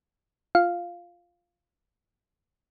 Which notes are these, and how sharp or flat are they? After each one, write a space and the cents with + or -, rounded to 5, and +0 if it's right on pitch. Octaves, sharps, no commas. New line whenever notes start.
F4 +0 F5 +0